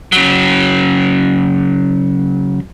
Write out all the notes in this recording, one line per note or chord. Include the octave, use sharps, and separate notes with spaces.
C#3 F#3